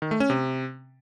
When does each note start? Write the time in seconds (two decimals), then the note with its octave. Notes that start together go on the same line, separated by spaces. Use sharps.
0.02 D#3
0.11 A3
0.20 C#4
0.30 C3